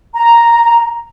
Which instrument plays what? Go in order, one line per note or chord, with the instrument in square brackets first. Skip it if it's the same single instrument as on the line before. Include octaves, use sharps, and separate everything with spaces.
[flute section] A#5